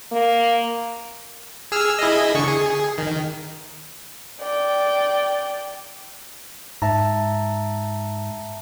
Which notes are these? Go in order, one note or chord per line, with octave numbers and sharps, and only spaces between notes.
A#3
G#4 E6 F6
E4 G#4 D#5
D3 C#6
G#4
D#3
D5 G5
G#2 E5 A5 A#5